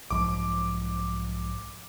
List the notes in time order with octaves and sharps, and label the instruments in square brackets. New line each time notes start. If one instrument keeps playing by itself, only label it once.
[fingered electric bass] B1 G#2 F3 [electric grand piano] D6